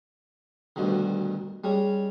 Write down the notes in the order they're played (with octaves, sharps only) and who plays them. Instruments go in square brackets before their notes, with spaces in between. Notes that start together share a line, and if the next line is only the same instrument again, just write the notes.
[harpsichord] D2 G2 B2 D3 D#3
G3 G#3 C#4